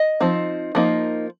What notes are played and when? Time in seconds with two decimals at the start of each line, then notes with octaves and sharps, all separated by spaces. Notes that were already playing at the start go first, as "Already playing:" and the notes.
Already playing: D#5
0.20 F3 C4 D#4
0.75 F3 A#3 D#4